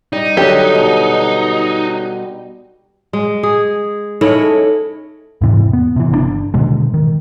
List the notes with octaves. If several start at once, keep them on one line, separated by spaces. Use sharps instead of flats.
G3 D#4
D3 F#3 G4
B2
G#3
G#4
C#4 D#4 E4 A4
E2 G#2 C3 E3
B3
C3 E3
G1 C#3 D4
B2 D3 D#3 G#3
D#3